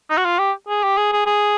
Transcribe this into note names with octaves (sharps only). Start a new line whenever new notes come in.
D#4
F#4
F4
G4
G#4
G4
G#4
G#4
G#4